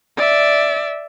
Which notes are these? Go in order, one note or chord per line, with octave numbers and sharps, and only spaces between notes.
D5 E5